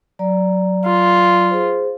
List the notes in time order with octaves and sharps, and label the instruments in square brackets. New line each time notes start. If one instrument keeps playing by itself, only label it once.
[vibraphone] F#3 D5 A#5
[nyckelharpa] F4
[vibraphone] G#4 C5